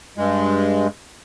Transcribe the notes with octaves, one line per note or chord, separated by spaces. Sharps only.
G2 G#3